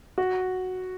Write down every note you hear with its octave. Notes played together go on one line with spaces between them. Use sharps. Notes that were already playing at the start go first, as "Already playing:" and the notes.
F#4